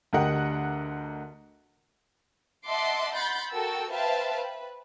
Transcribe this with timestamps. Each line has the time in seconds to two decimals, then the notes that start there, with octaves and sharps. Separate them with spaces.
0.13 D2 D3 G4 A#4 D#5 F#5
2.67 D#5 E5 F#5 A5 C6 D6
3.15 F#5 B5 C6 G6 A6
3.53 F#4 A4 A#4 G5 E6
3.92 B4 C5 E5 F5 G5 A5
4.36 B4